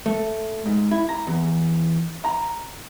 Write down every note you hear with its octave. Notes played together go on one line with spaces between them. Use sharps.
A3
G#2
E4
A#5
E2
A#5